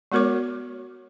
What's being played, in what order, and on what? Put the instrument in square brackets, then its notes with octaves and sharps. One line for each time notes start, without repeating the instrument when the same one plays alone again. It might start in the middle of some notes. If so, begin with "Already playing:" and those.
[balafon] G#3 B3 F#4 A#4 C#5 D6